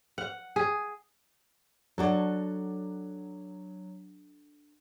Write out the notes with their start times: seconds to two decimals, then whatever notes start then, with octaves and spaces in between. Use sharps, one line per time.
0.18 F#5
0.56 G#4
1.98 F#3 D4 F#4 A4